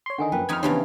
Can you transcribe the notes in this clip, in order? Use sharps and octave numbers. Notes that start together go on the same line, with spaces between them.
C#5 C6
D3 D#3 D#4 F#5 G#5 D#6
F#2 F3 A#3 B4 G5
F2 D#4 B5 F6 G#6
C#3 E3 F3 B3 C#4 D4 G4 A5